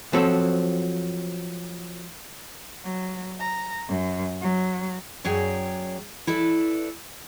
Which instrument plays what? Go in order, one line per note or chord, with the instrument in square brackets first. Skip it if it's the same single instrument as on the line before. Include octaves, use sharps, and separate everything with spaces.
[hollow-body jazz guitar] F3 F#3 C4 F#4 A4
[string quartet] F#3
A#5
F#2
F#3
[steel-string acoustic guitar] F#2 F#3 G#4 C#5 D5 G5
E4 A4 B4 D5